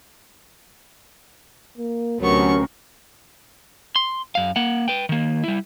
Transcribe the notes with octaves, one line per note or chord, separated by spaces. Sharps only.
A#3
D2 C3 F#3 B3 C#4 A#4 C#6
C6
F#2 F5
A#3 F#5
B4 G5
D#3 A#3
G3 E4